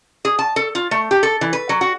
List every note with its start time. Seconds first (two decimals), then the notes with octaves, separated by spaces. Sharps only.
0.25 G#4
0.39 A5
0.56 A4
0.75 F4
0.91 A3
1.11 G4
1.23 A4
1.41 E3
1.53 B4
1.69 F#3
1.81 F#4